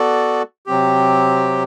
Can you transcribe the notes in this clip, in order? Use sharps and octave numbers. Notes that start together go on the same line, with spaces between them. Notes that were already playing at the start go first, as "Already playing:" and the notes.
Already playing: B3 F#4 A4 D5
C3 F#3 C4 G4